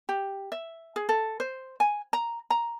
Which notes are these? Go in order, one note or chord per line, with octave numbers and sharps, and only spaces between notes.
G4
E5
G#4
A4
C5
G#5
A#5
A#5